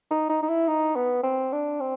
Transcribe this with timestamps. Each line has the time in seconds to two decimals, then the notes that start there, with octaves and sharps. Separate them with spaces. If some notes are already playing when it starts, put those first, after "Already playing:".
0.11 D#4
0.29 D#4
0.42 D#4
0.49 E4
0.68 D#4
0.96 B3
1.24 C4
1.52 D4
1.80 C4